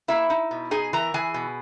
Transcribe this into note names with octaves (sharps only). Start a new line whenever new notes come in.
A#3 E4 E5
D#4
B2
D#4 G#4 G#5
E3 A#4 A#5
E3 G#4 G#5
B2